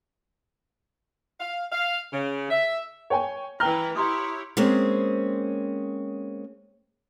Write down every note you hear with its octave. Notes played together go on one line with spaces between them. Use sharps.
F5
F5
C#3
E5
C#5 G5 G#5
E3 B4 G5 A#5 F6 A#6 G7
E4 G4 C#5 A#5 C6 D#6
G#3 A#3 C4 C#4 G#4 C5